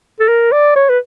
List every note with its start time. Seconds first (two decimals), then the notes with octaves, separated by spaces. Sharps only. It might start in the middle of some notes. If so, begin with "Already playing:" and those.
0.20 A4
0.28 A#4
0.52 D5
0.76 C#5
0.89 B4